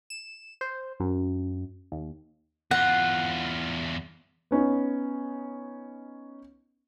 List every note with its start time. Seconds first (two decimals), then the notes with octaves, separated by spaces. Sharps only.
0.10 E7
0.61 C5
1.00 F#2
1.92 D#2
2.71 E2 F4 F#5
4.51 B3 C#4 D#4